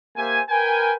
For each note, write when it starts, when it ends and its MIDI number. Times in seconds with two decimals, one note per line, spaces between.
0.17 0.40 58
0.17 0.40 67
0.17 0.40 72
0.17 0.40 76
0.17 0.40 80
0.50 0.94 70
0.50 0.94 71
0.50 0.94 79
0.50 0.94 80